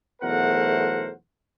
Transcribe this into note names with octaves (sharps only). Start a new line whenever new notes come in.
B1 E2 A3 A#4 C5 F#5